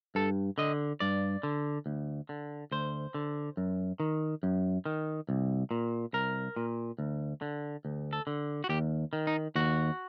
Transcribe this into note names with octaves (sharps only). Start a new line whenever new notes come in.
G2 A4
D3 D#5
G2 D5
D3
D2
D3
D2 C5
D3
F#2
D#3
F#2
D#3
C2
A#2
C2 A#4
A#2
D2
D3
D2
A4
D3
F#4
D#2 G4
D#3
D#4
D#2 F#4